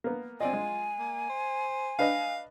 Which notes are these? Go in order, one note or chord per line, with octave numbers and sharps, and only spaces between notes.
A#3 B3
C4 F4 D5 D#5 G#5
G#3
A#3
C5
D4 B4 D#5 F5